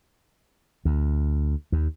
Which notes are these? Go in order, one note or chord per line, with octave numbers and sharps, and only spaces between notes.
D2
D#2